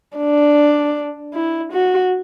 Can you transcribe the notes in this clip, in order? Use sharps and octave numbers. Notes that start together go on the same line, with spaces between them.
D4
E4
F#4